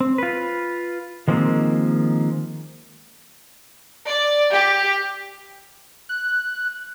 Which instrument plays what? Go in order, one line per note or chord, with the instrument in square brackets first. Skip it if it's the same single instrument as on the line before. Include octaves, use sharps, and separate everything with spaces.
[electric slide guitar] C4
F4 B4
D#3 F3 G#3 A#3 C4
[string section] D5
G4
[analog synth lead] F#6